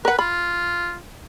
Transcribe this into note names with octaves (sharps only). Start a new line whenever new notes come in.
A#4 B4 F#5
F4 B5